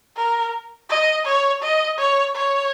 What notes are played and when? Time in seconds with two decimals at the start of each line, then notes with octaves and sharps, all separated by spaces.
0.17 A#4
0.90 D#5
1.26 C#5
1.62 D#5
1.99 C#5
2.35 C#5